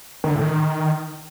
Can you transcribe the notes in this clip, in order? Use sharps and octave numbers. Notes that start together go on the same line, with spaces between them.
D#3
D3
A2
D#3